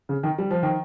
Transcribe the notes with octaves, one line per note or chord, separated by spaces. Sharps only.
C#3
D#3
G3
F3
D#3